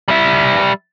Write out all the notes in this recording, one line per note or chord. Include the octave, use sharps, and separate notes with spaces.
G3 E5